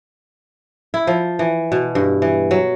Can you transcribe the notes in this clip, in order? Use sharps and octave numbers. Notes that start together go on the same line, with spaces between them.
E4
F3
E3
B2
G2
E3
F#3